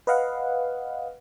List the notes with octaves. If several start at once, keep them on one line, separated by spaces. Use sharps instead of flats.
B4 D#5 F5 F#5